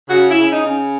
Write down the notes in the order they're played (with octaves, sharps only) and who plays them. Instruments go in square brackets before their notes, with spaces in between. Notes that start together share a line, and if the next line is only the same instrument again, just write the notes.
[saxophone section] C#3 F#4
E4
C#3
D#4
C#3